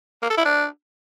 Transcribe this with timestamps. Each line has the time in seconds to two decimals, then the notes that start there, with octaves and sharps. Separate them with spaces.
0.22 A#3
0.30 A4
0.37 E4
0.45 D4